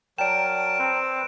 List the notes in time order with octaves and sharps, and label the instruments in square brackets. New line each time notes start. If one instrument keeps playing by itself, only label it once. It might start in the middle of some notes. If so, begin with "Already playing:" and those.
[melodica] F#3 A#4 A5 [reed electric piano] D5 G5 [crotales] D7 E7
[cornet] C4 [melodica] B4